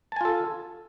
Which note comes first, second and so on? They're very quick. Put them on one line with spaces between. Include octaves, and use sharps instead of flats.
A5 G#5 F4 A4